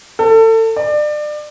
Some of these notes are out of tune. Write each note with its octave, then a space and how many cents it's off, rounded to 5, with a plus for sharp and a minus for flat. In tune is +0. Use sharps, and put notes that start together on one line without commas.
A4 +30
D5 +30